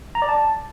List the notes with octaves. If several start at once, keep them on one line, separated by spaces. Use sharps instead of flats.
A#5
D5
A5